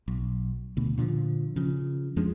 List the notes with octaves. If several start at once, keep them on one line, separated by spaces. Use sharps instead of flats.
B1
D2 B2
A#2 D3 E3 F3
C#3 F3
F2 F3 G#3 D4